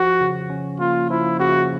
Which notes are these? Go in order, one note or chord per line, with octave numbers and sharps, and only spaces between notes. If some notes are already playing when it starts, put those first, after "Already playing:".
Already playing: F3 F#4
C#3
C#4
A#3 F4
F3 E4
C#3 F#4